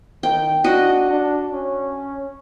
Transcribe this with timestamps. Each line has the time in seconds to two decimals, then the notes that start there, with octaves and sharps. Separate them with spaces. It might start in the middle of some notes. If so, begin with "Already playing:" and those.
0.23 D#3 G5
0.64 D4 F#4 D#5
1.10 D4
1.52 C#4